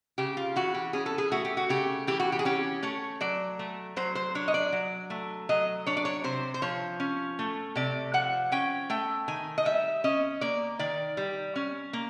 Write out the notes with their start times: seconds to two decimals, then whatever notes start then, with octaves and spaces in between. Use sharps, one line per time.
0.18 C#3 G4
0.37 F4
0.56 E3 F#4
0.74 G4
0.93 C#4 G#4
1.06 A4
1.18 G#4
1.32 A3 F#4
1.45 G4
1.57 F#4
1.69 C#3 G4
2.07 E3 G4
2.20 F#4
2.32 G4
2.39 G#4
2.45 C#4 G4
2.83 A3 C#5
3.21 F#3 D5
3.59 A3
3.96 F#3 C5
4.15 C5
4.35 D4 C#5
4.48 D#5
4.54 D5
4.72 F#3
5.10 A3
5.49 F#3 D#5
5.87 D4 C#5
5.97 D5
6.05 C#5
6.24 C3 C5
6.54 C5
6.62 F3 C#5
7.00 C#4
7.39 A3
7.76 C3 D5
8.14 F3 F#5
8.52 C#4 G5
8.90 A3 G5
9.28 D#3 G#5
9.58 D#5
9.65 G3 E5
10.04 C#4 D#5
10.41 A#3 D5
10.79 D#3 D5
11.17 G3
11.56 C#4
11.93 A#3